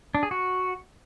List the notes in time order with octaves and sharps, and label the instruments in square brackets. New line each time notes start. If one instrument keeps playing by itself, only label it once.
[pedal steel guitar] D4
G#4
F#4